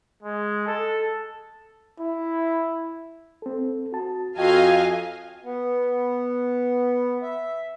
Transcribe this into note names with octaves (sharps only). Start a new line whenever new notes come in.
G#3
A4
E4
C4 A4
F#4 A5
F2 F#4 D#5 F5 G5 G#5
B3
E5